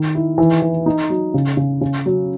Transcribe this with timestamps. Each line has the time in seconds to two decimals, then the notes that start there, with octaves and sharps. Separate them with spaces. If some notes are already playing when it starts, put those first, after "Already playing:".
Already playing: D#3
0.15 E4
0.38 E3
0.62 E3
0.86 D#4
1.10 F#3
1.34 C#3
1.57 C#3
1.81 C#3
2.06 F#3